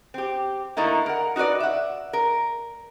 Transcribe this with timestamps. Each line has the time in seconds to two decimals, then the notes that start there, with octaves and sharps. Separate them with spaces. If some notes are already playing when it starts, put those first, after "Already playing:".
0.14 C4 G4
0.77 D3 A3 A#3 D#4 E4
1.06 A#4 F#5
1.36 D#4 F#4 A#4 B4 D5
1.60 E5 F#5
2.13 A#4